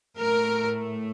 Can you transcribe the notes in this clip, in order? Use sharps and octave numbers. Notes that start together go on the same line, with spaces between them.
A2 A3 A#4